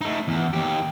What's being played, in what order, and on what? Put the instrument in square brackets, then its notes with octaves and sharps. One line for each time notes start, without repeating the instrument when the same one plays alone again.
[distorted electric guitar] A3 D#4
E2
D#2 G4